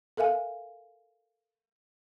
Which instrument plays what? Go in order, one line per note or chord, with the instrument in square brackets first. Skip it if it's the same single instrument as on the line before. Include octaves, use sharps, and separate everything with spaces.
[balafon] A4 A#4 E5 F5 G#5